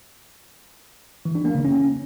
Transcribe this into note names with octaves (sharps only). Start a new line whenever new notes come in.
E3
D4
A#3
C#3
C#4